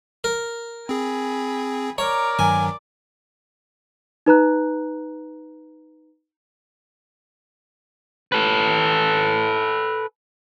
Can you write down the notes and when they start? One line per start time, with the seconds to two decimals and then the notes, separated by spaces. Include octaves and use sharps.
0.24 A#4
0.89 C4 G#4 G#5 B5
1.98 A#4 C#5 D5 A#5
2.39 G2 D#3 F#3 G#5
4.26 D#4 B4 A#5 F#6
8.32 A4 B4